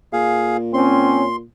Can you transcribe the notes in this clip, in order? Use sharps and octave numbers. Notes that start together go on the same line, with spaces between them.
A#2 G#4 F5
C4 C#4 C6